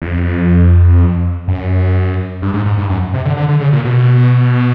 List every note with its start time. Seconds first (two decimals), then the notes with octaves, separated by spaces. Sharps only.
0.02 E2
0.06 F2
1.48 F#2
2.42 G2
2.54 G#2
2.66 G#2
2.78 G2
2.90 F#2
3.14 C3
3.25 D3
3.37 D3
3.49 D3
3.61 C#3
3.73 A#2
3.85 B2